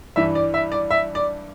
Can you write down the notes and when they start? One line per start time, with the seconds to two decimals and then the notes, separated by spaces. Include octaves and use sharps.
0.16 G2 E3 G3 D4 E5
0.35 D5
0.54 E5
0.72 D5
0.91 E5
1.15 D5